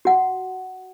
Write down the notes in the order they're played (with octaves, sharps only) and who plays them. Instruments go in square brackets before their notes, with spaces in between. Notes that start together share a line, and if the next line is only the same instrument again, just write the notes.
[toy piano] F#4 F#5